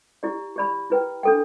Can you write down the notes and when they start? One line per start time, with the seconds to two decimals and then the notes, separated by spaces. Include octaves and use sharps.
0.23 E4 G4 D5
0.56 G4 D5 B5
0.90 E4 B4 G5
1.23 D4 A4 G5